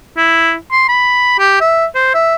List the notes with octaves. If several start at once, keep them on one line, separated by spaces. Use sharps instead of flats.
E4
C6
B5
G4
E5
C5
E5